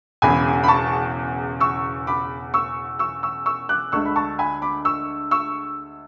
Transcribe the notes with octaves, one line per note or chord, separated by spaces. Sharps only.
E1 E2 C#3 G#5 B5
B5
A5 C#6
C#6 E6
B5 D6
C#6 E6
C#6 E6
C#6 E6
C#6 E6
D6 F#6
D2 D3 G#3 C#6 E6
B5
A5 C#6
G#5 B5
B5 D6
C#6 E6
C#6 E6